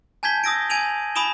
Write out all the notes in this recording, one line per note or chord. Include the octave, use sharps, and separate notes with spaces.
G#5 A5 G6 G#6 B6 G7
D#6 E6 A#6 D7
G#5 G#6 D7 D#7 F7 F#7
G#5 B5 D#6 D7 E7 G7